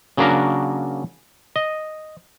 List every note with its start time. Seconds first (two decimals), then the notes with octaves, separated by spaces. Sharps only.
0.17 C#3 F#3 A#3 D4 F#4 A#4
1.56 D#5